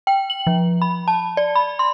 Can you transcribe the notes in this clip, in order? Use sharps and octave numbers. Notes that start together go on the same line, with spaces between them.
G5
F#7
F3
B5
A5
D5
B5
C6